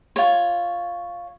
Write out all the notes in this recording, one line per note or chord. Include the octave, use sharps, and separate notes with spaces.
F4 C#5